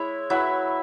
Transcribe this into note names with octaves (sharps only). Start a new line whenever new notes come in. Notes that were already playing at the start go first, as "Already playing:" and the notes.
Already playing: G#3 E4 C#5 E5
F#3 E4 B4 E5